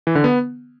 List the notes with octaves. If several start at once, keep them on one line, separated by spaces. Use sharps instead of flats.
E3
D3
B3